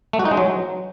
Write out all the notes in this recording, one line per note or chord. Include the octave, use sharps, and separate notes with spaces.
A3
F#4
D#4
G#3
F#3